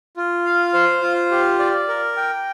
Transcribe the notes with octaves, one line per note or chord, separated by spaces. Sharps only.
F4
F5
C5
F4
G4
D5
A#4
G5